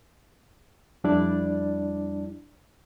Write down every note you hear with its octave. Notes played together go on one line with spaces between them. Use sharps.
F2 G3 D4 E4 D5